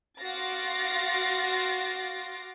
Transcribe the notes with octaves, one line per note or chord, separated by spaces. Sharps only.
F#4 F5 C6 D6 A6 A#6